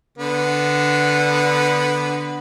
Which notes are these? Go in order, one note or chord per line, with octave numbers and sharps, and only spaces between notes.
D3 B3